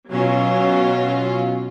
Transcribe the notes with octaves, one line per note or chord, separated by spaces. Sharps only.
B2 F#3 C#4 F4